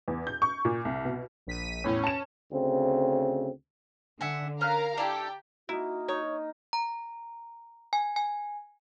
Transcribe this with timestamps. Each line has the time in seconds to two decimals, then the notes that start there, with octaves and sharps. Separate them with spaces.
0.08 E2
0.27 G6
0.42 C#6
0.65 A#2
0.85 C2
1.05 B2
1.47 A#1 B6 D#7
1.84 E2 A2 C#4
2.04 A5 E7
2.51 D2 C#3 C4
4.21 D3 E5 F#5 G#5
4.61 C#4 A#4 F5 A#5 F6 F#6
4.98 D4 E4 G4 A4
5.69 A#3 D#4 E4 F#4
6.08 D#4 C#5
6.73 A#5
7.93 G#5
8.16 G#5